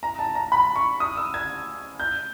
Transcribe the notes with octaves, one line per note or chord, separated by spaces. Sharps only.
A#5
A5
A#5
B5
C#6
D#6
E6
G#6
G6